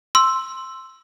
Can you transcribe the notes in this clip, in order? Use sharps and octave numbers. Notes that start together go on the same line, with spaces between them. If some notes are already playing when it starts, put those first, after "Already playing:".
C6 E6